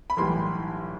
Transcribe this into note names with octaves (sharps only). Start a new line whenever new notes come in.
B5
B1 A2 E3 G3 C6